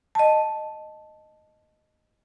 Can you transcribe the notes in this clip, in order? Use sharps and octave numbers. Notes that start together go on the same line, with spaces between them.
D#5 A5